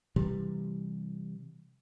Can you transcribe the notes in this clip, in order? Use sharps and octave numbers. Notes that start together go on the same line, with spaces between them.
C3 E3 G3